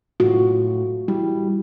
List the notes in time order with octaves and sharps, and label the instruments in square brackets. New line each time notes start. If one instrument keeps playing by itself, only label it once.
[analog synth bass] A2 [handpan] F4 F#4
[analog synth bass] G3 [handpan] E4